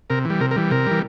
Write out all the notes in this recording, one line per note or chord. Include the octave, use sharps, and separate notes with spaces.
C3 A#4
E3 G3
C3 A#4
A#4
E3 G3
C3 A#4
E3 G3